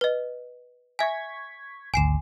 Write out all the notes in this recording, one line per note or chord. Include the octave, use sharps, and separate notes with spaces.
B4 D#5
E5 G#5 C#6 G#6 B6
G#1 D2 G#5 C7 E7